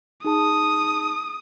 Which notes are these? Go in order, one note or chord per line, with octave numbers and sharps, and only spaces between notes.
D#4 G#4 A5 D#6